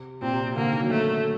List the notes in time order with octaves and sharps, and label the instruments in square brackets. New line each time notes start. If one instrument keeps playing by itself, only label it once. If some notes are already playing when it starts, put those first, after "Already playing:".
Already playing: [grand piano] C3
[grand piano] A#2 [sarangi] C4
[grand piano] C3
C3
[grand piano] D3 [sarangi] A#3
[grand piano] D#3
F#3
[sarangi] A3